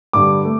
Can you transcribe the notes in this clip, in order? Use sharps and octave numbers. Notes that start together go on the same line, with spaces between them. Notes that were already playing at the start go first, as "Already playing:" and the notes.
G2 D3 G3 D6
A3